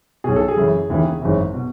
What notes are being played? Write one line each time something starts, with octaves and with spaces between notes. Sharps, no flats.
B1 B2 G#4
A4
G#4
F#1 F#2 C#3 E3
E1 D#2 C#3 E3
G#1 F#2 C#3 E3
B2